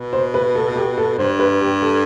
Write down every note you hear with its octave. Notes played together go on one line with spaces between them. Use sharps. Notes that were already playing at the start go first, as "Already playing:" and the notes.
Already playing: B2
C5
B4
A4
A4
G4
A4
G2 C5
B4
G4
A4